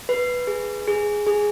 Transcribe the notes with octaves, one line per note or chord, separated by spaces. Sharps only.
B4
G#4
G#4
G#4